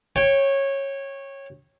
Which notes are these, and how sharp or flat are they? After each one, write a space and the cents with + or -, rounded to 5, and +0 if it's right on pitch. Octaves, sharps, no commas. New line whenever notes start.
C#5 -15 G5 +0